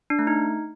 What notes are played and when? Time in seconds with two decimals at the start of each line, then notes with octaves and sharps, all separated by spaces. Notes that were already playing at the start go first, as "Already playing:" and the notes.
0.10 D4
0.19 A3
0.27 D#4